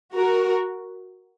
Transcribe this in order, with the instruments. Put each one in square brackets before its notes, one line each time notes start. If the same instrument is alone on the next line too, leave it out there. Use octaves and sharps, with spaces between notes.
[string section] F#4 A#4